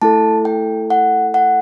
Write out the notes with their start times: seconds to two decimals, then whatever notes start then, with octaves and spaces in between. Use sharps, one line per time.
0.02 A3 E4 A4 A5
0.45 G5
0.90 F#5
1.34 F#5